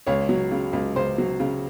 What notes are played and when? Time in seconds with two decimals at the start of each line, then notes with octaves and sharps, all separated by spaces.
0.07 C#2 C#5
0.29 F#3
0.51 C#3
0.73 C#2
0.96 C#2 C5
1.18 F#3
1.40 C#3